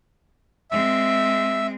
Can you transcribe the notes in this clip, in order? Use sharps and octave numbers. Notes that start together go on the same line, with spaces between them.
G#3 C4 E5